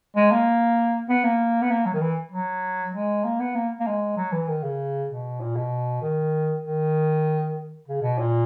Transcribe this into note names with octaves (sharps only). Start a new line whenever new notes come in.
G#3
A#3
B3
A#3
B3
A#3
F#3
D#3
E3
F#3
G#3
A#3
B3
A#3
A#3
G#3
F#3
E3
D#3
C#3
B2
A#2
B2
D#3
D#3
C#3
B2
A#2